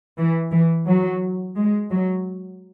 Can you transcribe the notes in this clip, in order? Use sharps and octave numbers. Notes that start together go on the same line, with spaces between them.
E3
E3
F#3
G#3
F#3